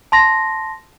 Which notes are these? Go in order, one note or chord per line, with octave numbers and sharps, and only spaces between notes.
A5 C6 A#6